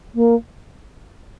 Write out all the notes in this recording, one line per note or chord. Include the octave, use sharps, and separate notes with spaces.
A#3